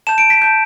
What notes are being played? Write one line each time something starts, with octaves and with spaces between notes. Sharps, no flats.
A5 G6 E7
D7
B6
A5 G6